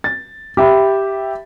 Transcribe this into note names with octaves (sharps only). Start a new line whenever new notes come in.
A6
G4 E5 B5